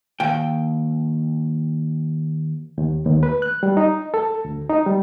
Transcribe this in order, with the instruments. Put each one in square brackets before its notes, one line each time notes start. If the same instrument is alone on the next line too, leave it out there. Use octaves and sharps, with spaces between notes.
[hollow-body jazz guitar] D#2 G5
[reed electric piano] D#2
D#2
B4
F#6
G3
D#4
A4
D2
D#4
G3